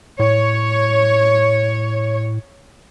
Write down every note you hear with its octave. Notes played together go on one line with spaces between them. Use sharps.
A2 C#5